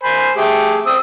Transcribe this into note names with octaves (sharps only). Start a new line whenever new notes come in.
C5 G#5 B5
A3 G4 G#4
C4 D#6 E6